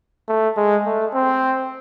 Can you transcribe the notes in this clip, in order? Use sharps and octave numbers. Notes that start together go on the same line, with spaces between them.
A3
G#3
A3
C4